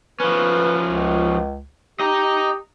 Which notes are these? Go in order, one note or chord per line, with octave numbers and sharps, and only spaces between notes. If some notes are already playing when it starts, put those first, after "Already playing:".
F3 C#4 B4
C#2
G4 D#5 A#5